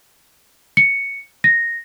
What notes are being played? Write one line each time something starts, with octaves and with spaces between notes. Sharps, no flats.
C#7
A#6